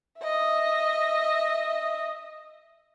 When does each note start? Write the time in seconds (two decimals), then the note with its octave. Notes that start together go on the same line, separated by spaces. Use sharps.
0.21 D#5 E5